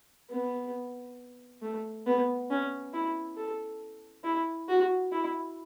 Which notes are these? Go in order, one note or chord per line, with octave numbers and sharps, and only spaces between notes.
B3
A3
B3
C#4
E4
A4
E4
F#4
E4